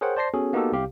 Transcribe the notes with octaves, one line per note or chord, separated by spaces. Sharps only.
G#4 A#4 C5 C#5 F#5 G5
C5 D5 A5 C6 A#6 C7
B3 C#4 F#4 G#4 A4
A#3 B3 D#4 F#4 G4 A4
C2 C3 G4 F5